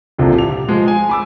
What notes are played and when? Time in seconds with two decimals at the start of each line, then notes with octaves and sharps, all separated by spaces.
0.18 F1 C2 A#2 D3 F3
0.34 G4 F7
0.69 F3 G#3
0.88 G#5
1.09 B5 D6 E6